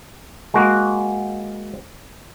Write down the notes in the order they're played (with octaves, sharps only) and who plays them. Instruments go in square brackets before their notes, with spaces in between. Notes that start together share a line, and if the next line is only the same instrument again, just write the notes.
[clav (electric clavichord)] G#3 A#3 F#4